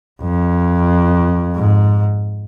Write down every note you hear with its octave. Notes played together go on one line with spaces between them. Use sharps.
F2
G#2